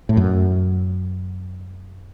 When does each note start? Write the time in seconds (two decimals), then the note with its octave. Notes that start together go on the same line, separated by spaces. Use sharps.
0.09 A2
0.17 F#2